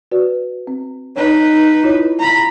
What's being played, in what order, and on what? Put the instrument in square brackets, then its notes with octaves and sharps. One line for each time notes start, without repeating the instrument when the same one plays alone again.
[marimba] F#4 B4 D5
C4
[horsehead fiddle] D#4 B4 [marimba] C#5
[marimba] E4 F4 C#5
[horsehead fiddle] A#5 B5